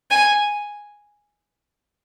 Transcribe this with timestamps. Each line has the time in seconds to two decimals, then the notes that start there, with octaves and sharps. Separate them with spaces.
0.11 G#5